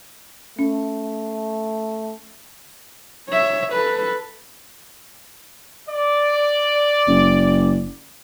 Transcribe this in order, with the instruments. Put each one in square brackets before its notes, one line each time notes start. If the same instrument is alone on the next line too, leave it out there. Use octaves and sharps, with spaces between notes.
[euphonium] A3 [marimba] C#4
[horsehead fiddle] C#5 E5
A4 B4
[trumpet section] D5
[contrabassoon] F#1